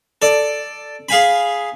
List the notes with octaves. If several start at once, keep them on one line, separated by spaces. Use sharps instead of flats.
A4 D5
G#4 F5 G#5 B5